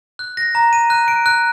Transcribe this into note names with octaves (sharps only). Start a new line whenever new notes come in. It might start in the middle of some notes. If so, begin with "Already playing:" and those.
F#6
A#6
A#5
D#7
F#6
D7
F#6